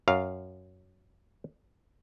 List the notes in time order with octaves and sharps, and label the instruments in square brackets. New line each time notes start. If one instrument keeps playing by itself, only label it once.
[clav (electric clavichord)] F#2 F5